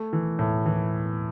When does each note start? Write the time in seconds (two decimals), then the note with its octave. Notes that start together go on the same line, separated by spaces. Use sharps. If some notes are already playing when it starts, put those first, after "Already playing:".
Already playing: A3
0.13 E3
0.39 A2
0.66 E3